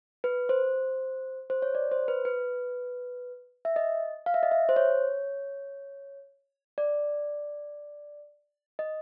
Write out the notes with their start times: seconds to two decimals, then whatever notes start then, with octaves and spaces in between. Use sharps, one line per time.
0.24 B4
0.49 C5
1.50 C5
1.62 C#5
1.75 D5
1.91 C5
2.08 B4
2.25 B4
3.65 E5
3.76 D#5
4.26 F5
4.34 E5
4.43 D#5
4.51 E5
4.69 C5
4.76 C#5
6.78 D5
8.79 D#5